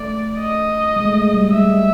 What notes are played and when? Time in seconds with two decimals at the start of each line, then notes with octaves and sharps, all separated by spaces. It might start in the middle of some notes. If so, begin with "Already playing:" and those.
Already playing: A3 D5
0.40 D#5
0.96 G#3
1.06 A3
1.14 G#3
1.34 G3
1.47 G#3 E5
1.61 G3